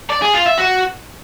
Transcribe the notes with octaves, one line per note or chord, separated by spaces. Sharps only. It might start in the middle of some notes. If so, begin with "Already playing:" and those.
D5
G#4
F4
E5
F#4